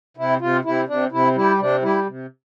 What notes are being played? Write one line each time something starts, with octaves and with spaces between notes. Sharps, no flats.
C3 E4
C3 F4
C3 E4
C3 D4
C3 E4
G3 E4
C3 D4
G3 E4
C3